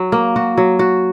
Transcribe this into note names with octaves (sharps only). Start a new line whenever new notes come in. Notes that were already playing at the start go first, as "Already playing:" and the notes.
Already playing: F#3
A#3
F#4
F#3
F#4